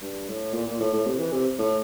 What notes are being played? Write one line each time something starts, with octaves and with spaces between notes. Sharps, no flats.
G2
A2
A#2
A#2
A2
A2
C3
E3
C3
A2